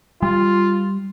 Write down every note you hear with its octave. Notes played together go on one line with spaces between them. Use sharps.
G3 F4